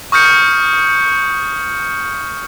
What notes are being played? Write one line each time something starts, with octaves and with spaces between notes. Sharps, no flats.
C#6 D#6 F6 G6 C#7